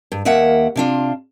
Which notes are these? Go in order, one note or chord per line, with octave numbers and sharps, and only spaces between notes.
G2
D#2 D#3 A#3 E5 F#5
C3 D4 F4